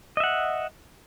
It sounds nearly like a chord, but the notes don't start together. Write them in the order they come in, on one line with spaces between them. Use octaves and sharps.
D#5 E5 F#5